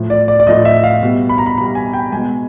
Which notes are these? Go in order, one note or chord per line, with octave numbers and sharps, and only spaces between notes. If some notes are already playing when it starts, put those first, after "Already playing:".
Already playing: A2 F3 A3
D5
D5
D5
A2 F3 A3 D#5
E5
F5
B2 G3
B5
A#5
B5
B2 G3 B5
G#5
G5
B2 G#3 G#5